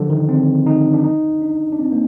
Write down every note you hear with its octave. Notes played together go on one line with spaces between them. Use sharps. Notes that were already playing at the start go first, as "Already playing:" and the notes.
Already playing: D3 F3 G3
D#3
C4
D#4
D4
D#4
D4
D4
C4
A#3